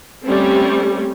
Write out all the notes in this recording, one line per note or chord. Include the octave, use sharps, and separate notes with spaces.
G3 A3 C4 C#4